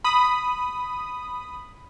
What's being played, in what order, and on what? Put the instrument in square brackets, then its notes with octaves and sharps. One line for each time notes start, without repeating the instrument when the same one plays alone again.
[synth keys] B5 D#6